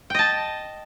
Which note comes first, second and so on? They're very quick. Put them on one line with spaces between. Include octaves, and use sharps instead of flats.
G5 D#5 A5